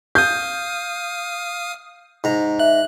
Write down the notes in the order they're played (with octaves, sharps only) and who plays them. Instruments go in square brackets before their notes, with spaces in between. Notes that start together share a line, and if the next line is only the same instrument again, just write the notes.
[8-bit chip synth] F5 D#6 [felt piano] G6
[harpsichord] G#2 A#5
[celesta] E5 [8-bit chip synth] F#6